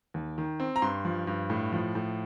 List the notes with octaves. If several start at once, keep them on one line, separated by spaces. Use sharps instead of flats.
D#2
D#3
C4
A#5
G2 C6
F3
G2
A2
F3
A2